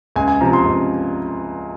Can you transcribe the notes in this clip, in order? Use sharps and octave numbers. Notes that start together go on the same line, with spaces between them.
C#2 G#5
G#5
C3 F3 A#5
C6
C#2